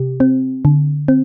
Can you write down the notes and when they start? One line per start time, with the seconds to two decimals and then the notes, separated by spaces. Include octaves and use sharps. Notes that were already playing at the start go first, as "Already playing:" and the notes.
Already playing: C3 G4
0.20 C4
0.65 D3
1.08 C4